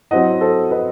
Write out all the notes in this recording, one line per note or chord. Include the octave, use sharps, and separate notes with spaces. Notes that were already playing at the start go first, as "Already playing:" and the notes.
F#3 C4 E4 D#5 F#5
A4 C5
B4 D#5